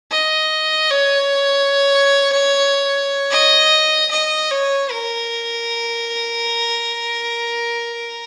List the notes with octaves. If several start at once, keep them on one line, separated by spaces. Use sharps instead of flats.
D#5
C#5
D#5
D#5
C#5
A#4